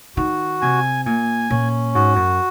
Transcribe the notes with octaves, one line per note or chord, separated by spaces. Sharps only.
D#3 F#4
C3 G#5
A#2 G#5
A#2 C#4
G#2 F#4
F#2